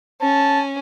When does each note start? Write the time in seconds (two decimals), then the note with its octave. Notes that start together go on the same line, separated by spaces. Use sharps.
0.21 C#4 A5